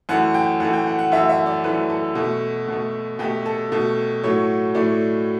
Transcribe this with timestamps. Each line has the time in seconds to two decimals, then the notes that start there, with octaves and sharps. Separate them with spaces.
0.09 F#2 E3 A3 F#5
0.34 G5
0.60 F#2 E3 A3 F#5
0.73 G5
0.87 F#5
0.99 F#5
1.12 F#2 E3 A3 E5
1.29 E5
1.46 D5
1.64 F#2 E3 A3 B4
1.90 A4
2.15 B2 A3
2.68 B2 A3
3.19 B2 G4
3.24 A3
3.46 A4
3.72 B2 A3
4.23 A2 F#3 A3 C#5
4.75 A2 F#3 A3 D5